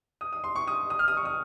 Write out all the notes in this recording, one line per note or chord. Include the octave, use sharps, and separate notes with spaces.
D#6
D#6
C6
C#6
D#6
D#6
F6
D#6
C#6
D#6